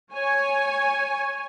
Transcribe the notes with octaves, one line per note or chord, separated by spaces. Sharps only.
C#5 G#5